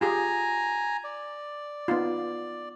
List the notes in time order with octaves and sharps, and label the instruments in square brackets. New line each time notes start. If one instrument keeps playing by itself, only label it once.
[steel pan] F4 G4 G#4 [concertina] G#5 A#5
[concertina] D5
[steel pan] B3 D#4 F4